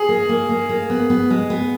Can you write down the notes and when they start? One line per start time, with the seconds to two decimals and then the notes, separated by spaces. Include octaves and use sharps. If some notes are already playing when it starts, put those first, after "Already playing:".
Already playing: G#4
0.09 A#3
0.29 A#3
0.49 A#3
0.69 A#3
0.90 B3
1.10 B3
1.30 G#3
1.50 B3